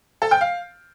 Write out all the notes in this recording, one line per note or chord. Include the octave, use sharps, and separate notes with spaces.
A4
G5
F5